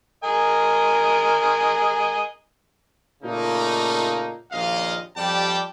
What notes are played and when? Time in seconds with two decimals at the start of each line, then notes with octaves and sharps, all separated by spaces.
0.24 A#4 D#5 G#5
3.23 A#2 C#3 A3 A#3 D#4
4.52 A#1 D#2 A#2 D#5 F5
5.17 F2 G3 G4 D5 G5 A5